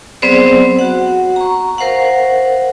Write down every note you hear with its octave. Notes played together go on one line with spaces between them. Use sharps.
F#3 B3 C4 G#4 C5 D5
F#4 F#5
A#5 C#6
A#4 C5 F5 F#5